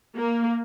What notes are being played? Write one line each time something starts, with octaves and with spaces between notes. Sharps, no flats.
A#3